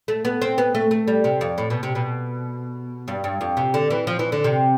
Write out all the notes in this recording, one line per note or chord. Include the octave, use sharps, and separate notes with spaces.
A3
B3
C4
B3
A3
A3
G3
C3
F2
A2
B2
C3
B2
G2
G2
F2
C3
D3
E3
F3
E3
D3
C3